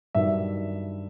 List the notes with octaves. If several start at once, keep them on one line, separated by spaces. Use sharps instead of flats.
G2 D#3 F#3 E5